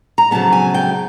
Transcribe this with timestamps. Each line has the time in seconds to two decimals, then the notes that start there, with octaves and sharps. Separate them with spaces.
0.18 A#5
0.31 F2 C#3 F#3 B3 A5
0.52 G#5
0.74 G5